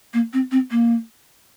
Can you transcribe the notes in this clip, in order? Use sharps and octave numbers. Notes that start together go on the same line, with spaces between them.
A#3
C4
C4
A#3